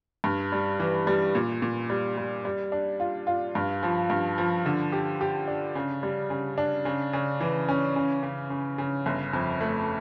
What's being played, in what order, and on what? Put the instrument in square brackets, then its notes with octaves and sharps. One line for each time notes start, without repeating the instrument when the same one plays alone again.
[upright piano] G2
G3
E3
G3
A#2
A#2
G3
G3
G3
D4
F4
F4
G2
F3
G2
F3
D3
G4
G4
D4
C#3
G3
C#3
D4
C#3
C#3
E3
C#4
C#3
C#3
C#3
C#3
G1
F2
A3